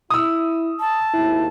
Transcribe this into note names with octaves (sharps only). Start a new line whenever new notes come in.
E4 D#6 E6
A5
G#1 D#2 E4